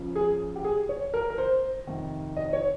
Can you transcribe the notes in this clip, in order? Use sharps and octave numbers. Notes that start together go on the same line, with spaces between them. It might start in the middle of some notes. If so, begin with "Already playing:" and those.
Already playing: C#2 C#3 F3
G#4
G4
G#4
C#5
A#4
A#4
C5
F2 C3 D#3
D#5
C#5